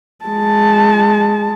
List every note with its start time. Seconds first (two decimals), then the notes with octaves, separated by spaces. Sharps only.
0.25 G#3 A5